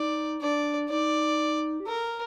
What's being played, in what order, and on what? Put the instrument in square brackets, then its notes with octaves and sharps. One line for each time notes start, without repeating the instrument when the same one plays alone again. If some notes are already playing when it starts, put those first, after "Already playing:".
Already playing: [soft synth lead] D#4 [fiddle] D5
[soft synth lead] D4 [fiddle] D5
[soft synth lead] D#4 [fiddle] D5
[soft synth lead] G4
[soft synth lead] A4 [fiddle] A#4